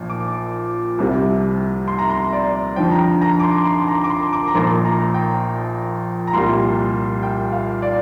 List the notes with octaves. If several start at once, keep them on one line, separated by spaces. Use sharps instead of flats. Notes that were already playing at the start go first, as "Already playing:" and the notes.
Already playing: A#1 A#2 F3
D6
C2 C3 G3
C6
A#5
C6
D5
F2 D3 F3 G5
A#5
G5
A#5
D6
C6
C6
A#5
D6
C6
D6
A#5
A#1 A#2 F3 C6
A#5
G5
A#5
C2 A#2 G3 C6
G5
F5
D5